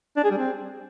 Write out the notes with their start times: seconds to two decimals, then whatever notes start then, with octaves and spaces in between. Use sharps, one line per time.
0.16 D4
0.24 G#4
0.31 G3
0.38 C4